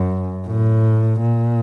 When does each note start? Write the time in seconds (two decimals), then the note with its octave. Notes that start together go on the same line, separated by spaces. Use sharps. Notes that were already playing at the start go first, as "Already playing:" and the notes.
Already playing: F#2
0.47 A2
1.20 A#2